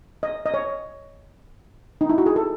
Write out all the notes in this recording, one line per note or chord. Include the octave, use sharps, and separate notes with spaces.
D#5
D#5
C#5
D#4
E4
F#4
G#4
A4